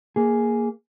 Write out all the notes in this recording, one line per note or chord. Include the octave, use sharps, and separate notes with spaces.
A#3 G#4